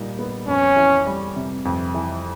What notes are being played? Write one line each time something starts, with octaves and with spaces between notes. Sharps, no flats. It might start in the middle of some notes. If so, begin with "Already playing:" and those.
Already playing: A#2 G3 D#4
B3
F2 C#4
E3
G3
C3
F2
E3